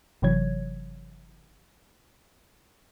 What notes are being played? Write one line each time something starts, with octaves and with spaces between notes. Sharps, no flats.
G1 C3 E3 F#3 C#5 G#6